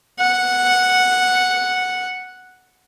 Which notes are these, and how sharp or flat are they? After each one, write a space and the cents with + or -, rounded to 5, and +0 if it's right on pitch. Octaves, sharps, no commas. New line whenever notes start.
F#5 -5